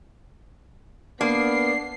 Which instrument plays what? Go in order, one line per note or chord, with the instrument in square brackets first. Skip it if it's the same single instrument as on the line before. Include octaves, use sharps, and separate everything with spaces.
[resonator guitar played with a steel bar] A#3 [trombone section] B3 [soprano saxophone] D4 [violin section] C7